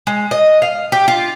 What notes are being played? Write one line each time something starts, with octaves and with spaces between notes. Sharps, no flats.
G#3
D#5
F5
G4
F4